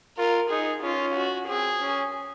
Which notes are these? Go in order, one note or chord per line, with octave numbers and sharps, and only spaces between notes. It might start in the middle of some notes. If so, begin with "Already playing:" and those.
F4 A#4
D#4 G#4
C#4 F4
F#4
C4 G#4
C#4